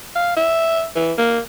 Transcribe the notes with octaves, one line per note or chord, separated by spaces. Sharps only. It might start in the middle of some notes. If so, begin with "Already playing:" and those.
F5
E5
E3
A#3